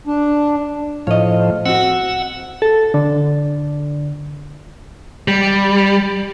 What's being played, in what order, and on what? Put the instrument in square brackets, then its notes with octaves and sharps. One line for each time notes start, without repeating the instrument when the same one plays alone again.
[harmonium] D4
[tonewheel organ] A2 F3 [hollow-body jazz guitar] C#5 D#5
[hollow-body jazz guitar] C4 F#4 [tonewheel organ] F#5 E6
[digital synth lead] A4
D3
[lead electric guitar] G3